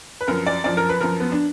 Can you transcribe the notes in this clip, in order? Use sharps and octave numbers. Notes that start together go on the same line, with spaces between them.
B4
F#2 F3 A#4
D5
F#2 F3 D5
A#4
B4
F#2 F3 A#4
B3
D4